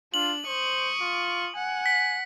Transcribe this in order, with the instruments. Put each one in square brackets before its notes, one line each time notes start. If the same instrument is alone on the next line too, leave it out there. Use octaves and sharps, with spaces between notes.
[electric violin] D4 [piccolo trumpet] F4 [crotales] F#7
[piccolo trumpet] C5 [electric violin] C#6 D#6
[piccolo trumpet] F4
[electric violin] F#5 [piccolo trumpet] G#5
[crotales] B6